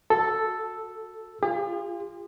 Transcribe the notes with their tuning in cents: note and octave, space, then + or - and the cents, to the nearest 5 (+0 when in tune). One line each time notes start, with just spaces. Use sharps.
F#4 +0 A4 +0 E6 +0
F4 -10 G#4 -45